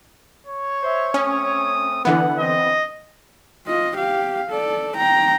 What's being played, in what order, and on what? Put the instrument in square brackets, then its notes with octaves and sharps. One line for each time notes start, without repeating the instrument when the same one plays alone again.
[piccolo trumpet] C#5
[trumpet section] C5 E5
[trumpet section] A3 C4 D#6 [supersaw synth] C#4
[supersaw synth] D3 E3 B3 [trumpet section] F#5
[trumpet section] C4 [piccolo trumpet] D#5
[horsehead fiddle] F4 D#5
G4 F5
A4 D5
G5 A#5